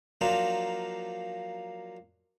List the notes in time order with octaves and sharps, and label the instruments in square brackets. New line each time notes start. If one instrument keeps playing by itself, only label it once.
[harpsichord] F3 F#3 A#3 D4 D#4 F4